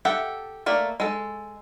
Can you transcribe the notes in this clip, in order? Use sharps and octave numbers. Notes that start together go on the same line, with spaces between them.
G4 A4 E5 F#5 G5
A3 A#3 D5
G#3 A4